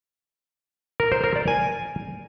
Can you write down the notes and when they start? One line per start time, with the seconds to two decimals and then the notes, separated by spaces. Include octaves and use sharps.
1.00 A#4
1.12 C5
1.24 A#4
1.36 D5
1.48 G#5